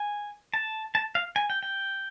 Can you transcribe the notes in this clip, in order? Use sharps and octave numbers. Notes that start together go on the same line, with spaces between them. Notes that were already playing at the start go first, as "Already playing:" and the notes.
Already playing: G#5
A5
A5
F5
G#5
G5
G5